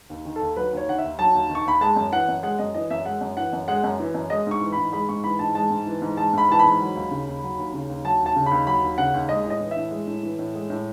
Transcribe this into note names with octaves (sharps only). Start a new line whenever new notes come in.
D#2
D#3
A4
D#2
F#3 B4
D#2 C#5
D#3 F#5
E5
D#2
F#3 A5
D#2
D#3
C#6
D#2 B5
G#3 A5
F#2
E3 F#5
F#2
G#3 F#5
F#2 D#5
E3 D#5
F#2 E5
G#3 F#5
F#2
E3 F#5
F#2
G#3 F#5
F#2
E3
F#2
G#3 D#5
G#2 C#6
E3
G#2 B5
G#3 B5
G#2 C#6
E3 B5
G#2 A5
G#3 A5
G#2
E3
G#2
G#3 A5
G#2 B5
E3 A5
G#2 B5
F#3
D#2
C#3
D#2
F#3
D#2
C#3
D#2
F#3 A5
D#2
A5
C#3
D#2 B5
F#3 B5
D#2
C#3 F#5
D#2
G#3 D#5
A2
D#5
E3
E5
A2
G#3
A2
E3
A2
G#3
A2